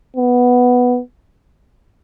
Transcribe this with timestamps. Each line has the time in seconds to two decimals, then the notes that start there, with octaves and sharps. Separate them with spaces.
0.16 B3